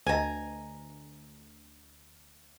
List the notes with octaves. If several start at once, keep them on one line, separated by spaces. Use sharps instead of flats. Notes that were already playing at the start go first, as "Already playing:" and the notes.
D2 B4 D#5 G#5 A#5